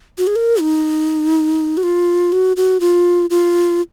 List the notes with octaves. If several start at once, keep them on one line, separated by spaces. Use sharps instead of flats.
F#4
G#4
A#4
D#4
F#4
F4
F#4
F#4
F4
F4